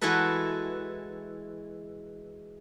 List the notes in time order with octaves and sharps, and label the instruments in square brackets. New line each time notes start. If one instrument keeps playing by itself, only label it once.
[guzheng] E3 G#3 E4 F#4 A4 B4